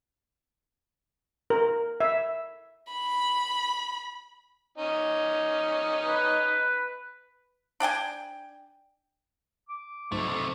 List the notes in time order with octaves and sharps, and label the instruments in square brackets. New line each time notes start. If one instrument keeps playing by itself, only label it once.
[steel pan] A#4
E5
[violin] B5
[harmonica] C#4 D#4
[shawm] B4
[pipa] D4 D5 G5 G#5
[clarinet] D6
[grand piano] B1 [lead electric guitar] C3 A3 [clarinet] C5